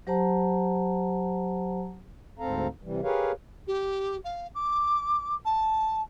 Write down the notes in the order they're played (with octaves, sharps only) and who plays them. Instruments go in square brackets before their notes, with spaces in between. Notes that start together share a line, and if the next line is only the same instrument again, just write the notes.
[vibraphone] F#3 G4 C5 F#5 A5 A#5
[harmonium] D2 G#2 C4 A4 F5 A#5
C3 E3 G3
G4 G#4 A#4 B4 C#5 F5
[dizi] G4
F5
D6
A5